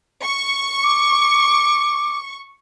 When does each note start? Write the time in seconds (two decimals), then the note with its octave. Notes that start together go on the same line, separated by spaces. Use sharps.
0.25 C#6
0.83 D6